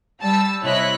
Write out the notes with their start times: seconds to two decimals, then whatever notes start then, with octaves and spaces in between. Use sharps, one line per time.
0.22 G3 A5 E6
0.63 C3 E4 C#5 D#5 F#6 B6